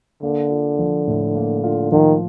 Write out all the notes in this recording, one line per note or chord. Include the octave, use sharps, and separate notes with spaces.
D3 A#3
F4
F3
A2
A#3
F4
D#3 F3